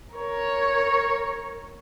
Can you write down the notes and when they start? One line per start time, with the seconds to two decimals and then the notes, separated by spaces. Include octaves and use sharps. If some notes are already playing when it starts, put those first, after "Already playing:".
0.14 A#4 C#5